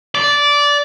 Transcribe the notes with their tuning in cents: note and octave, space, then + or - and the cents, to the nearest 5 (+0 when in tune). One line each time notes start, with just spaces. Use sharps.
D5 -15